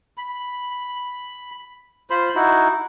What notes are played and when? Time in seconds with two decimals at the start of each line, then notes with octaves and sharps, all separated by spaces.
0.17 B5
2.10 F4 C5 B5 C6
2.35 D#4 E4 F#4